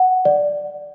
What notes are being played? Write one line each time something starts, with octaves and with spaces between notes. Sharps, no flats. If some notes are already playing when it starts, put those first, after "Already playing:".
Already playing: F#5
D5